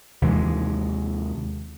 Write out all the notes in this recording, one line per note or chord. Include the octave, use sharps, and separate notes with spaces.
D#2 C3 E3 G#3